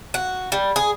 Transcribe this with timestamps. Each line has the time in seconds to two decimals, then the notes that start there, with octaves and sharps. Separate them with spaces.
0.14 F#4
0.52 G3
0.76 G#4